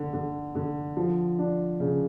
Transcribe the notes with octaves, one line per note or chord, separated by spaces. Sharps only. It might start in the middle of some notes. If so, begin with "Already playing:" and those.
Already playing: D3
D3
D3
F3
D4
C#3